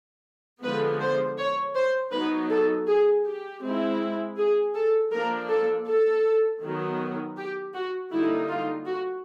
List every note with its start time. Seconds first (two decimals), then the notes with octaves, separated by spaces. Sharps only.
0.61 D3 F3 G#3 B3 B4
1.00 C5
1.38 C#5
1.75 C5
2.11 F#3 B3 D#4 B4
2.49 A4
2.87 G#4
3.24 G4
3.61 G#3 C4 E4
4.37 G#4
4.74 A4
5.11 F3 A#3 D4 A#4
5.49 A4
5.86 A4
6.62 D#3 F#3 B3
7.37 G4
7.74 F#4
8.11 D3 G3 A#3 D#4 E4
8.49 F4
8.86 F#4